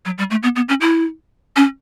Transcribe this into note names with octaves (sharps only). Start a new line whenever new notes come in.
F#3
G3
A3
B3
B3
C#4
E4
C#4